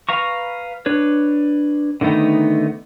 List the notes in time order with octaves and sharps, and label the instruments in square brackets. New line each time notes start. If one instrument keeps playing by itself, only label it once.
[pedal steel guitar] B4 F5 A#5 C#6
D4 B4 C#5
D3 D#3 A3 B3 D#4